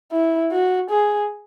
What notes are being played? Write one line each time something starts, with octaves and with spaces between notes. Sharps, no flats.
E4
F#4
G#4